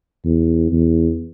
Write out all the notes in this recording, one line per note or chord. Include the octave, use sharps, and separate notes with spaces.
E2
E2